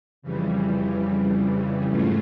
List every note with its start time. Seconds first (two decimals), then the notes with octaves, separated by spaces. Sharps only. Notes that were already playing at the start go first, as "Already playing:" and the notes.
0.22 F2 C#3 E3 G3
1.87 G#2 E3 A3 C#4 F4